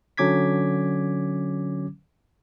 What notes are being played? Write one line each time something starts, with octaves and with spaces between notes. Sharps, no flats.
D3 F#3 C#4 D6 G#6 B6